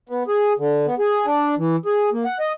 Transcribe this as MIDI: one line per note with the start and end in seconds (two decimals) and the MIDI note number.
0.09 0.23 59
0.28 0.53 68
0.59 0.86 50
0.86 0.95 59
0.99 1.26 68
1.26 1.55 62
1.58 1.76 52
1.86 2.10 68
2.12 2.24 58
2.25 2.38 78
2.40 2.52 75